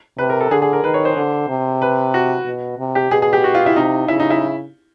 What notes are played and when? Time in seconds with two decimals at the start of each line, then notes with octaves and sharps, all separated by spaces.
0.18 C3 B4
0.30 A#4
0.41 A4
0.51 D3 G#4
0.62 G#4
0.73 A#4
0.84 D#3 B4
0.94 C#5
1.05 C5
1.16 D3
1.49 C3
1.82 B4
2.14 F#4
2.46 B2
2.78 C3
2.95 G4
3.11 B2 G#4
3.22 G#4
3.33 G4
3.44 F#4
3.55 F4
3.66 E4
3.76 C3 D#4
4.08 C#3 E4
4.20 D#4
4.30 E4